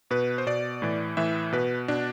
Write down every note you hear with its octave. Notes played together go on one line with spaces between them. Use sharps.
B2 B4
C5
B2 D5
A2 E3
A2 E3 E5
B2 B4
B2 D4